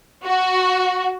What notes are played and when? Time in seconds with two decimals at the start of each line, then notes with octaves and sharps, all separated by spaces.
0.23 F#4